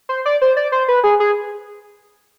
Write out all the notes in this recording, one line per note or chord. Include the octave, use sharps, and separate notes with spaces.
C5
D5
C5
D5
C5
B4
G#4
G#4